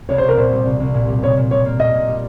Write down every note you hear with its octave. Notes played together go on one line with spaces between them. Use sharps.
C2 C#5
C5
C2
A#4
A#2 C5
G3
C2
C2
A#2
G3
A#2 C#5
A#2
G3 C#5
A#3
A#2 D#5
A#2
G3